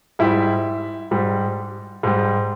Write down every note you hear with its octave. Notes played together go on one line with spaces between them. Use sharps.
G#2 G3 E4
G#2 G3
G#2 G3